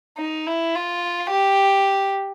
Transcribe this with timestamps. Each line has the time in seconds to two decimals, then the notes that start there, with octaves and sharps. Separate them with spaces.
0.18 D#4
0.47 E4
0.75 F4
1.31 G4